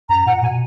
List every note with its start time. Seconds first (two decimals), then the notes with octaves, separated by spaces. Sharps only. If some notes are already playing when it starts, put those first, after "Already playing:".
0.09 F#2 A#5
0.26 A#2 F#5
0.42 B2 G#5